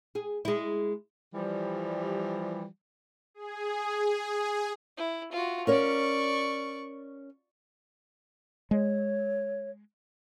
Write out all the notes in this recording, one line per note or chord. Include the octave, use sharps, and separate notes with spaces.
G#4
G#3 E4
E3 F3 G3
G#4
E4
F4 F#4
C#4 A#4 C#5 D5 C#6
G#3 C#5